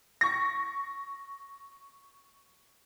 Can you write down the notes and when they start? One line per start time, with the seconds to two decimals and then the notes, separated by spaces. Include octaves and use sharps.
0.21 C#6 A#6